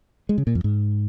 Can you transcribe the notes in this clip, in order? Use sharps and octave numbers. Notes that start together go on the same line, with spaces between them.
G#3
C#3
A#2
F2
G#2